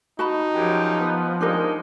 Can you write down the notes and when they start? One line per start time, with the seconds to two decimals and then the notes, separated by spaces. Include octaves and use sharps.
0.19 D#4 F#4 A5 B5
0.54 F#2 F3 G4
1.00 B3
1.41 G#3 D4 D#4 G4 A#4